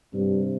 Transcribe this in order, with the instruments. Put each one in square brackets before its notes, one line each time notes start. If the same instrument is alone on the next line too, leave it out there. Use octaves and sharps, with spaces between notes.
[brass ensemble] G2 [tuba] C3